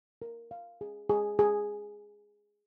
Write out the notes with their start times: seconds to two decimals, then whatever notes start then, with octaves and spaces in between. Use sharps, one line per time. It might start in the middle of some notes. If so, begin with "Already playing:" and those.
0.22 A#4
0.51 F5
0.81 G#4
1.09 G#4
1.39 G#4